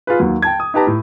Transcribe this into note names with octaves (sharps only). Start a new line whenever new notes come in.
F4 G#4 B4
D#2 F#3
G5 A5 G#6
D#6
D#4 G4 B4 A5 A#5
A2